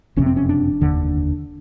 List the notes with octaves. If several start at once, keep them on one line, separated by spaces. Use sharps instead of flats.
F#1 F2 C3 C#4
C4
C#4
D4
F1 D#2 D3